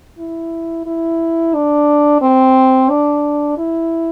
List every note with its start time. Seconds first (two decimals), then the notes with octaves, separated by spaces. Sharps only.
0.18 E4
0.86 E4
1.54 D4
2.22 C4
2.89 D4
3.58 E4